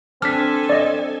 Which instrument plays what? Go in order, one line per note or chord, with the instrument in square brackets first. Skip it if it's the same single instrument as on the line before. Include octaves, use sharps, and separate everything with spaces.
[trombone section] C4 [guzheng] D4 [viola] A4 G#5 [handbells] F6 B6
[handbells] D5 D#5